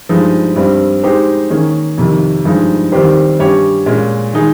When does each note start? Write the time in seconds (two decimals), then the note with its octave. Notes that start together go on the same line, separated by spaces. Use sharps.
0.09 G2 F3 G#3 D#4
0.56 G2 G3 C4
1.03 G#3 D#4 G4 C5
1.50 D#3 A#3 C#4 G#4
1.98 F2 C3 D#3
2.45 G2 F3 G#3 D#4
2.92 D#3 G3 C4 G4 C5
3.39 G2 G3 C#4 G4 C#5
3.86 A#2 G#3 C#4
4.33 D#3 G#3 D#4 G#4